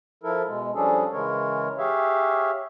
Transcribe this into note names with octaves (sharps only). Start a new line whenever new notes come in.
F3 E4 A4 A#4
B2 G#3
F3 G3 C#4 D4 G#4 A4
C#3 E3 G#3 A#4 C#5
G4 G#4 C#5 E5 F5